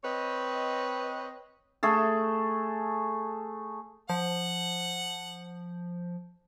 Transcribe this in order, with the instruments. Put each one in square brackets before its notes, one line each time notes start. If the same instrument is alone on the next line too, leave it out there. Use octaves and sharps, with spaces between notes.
[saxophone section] C4 B4 C#5 D#5
[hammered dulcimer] A3 G#4 A4
[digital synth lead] F3 [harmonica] F#5